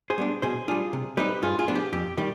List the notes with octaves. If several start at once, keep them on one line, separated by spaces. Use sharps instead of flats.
G#4 C5
G3 B3 D4
B2 G#4 C5
G3 D4 F4 G#4
C3
G3 C4 D#4 G4 B4
G2 F4 G#4
F4 G#4
F3 B3 D4
G4
F2 G4
D#3 G3 G4